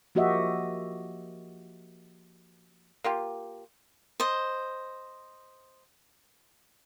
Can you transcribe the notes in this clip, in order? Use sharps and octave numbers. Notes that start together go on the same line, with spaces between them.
F3 A#3 F#4 G4 D#5 E5
A#3 F4 G4
C5 D#5